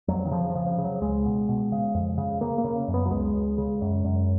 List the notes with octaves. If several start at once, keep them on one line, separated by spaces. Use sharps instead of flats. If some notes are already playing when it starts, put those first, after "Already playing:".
F2 F#3
D#3
C#3 F3
F3
C#3
F3
C#3
F#3
C#2 G#3
B2
B2
C#3
F2
C#3
C#3 A#3
A#3
C#3
F#2
B3
F#3
C#2 G#3
C#2
C#3
F#2
F#2